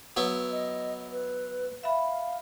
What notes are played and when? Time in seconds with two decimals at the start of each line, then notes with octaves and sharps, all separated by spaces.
0.16 F#3 B3 E4
0.52 D#5
1.10 B4
1.84 E5 F5 B5